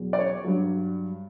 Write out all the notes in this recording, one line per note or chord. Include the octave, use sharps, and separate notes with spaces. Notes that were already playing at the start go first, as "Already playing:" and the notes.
Already playing: E2 B2 F#3
D5
C#5
G2 F#3